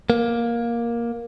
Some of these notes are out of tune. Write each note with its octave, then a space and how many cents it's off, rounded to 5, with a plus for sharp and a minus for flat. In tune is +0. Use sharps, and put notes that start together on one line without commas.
A#3 +10